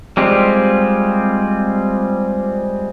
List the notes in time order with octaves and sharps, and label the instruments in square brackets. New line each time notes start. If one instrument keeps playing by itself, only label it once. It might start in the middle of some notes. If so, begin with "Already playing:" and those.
[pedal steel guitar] G3 G#3 C4 F4 G4